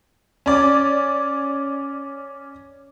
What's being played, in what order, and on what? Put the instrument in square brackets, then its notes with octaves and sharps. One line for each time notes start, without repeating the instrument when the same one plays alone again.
[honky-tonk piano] C#4 D5